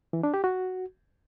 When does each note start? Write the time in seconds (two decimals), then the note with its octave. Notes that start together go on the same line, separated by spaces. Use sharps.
0.13 E3
0.23 D4
0.34 G4
0.44 F#4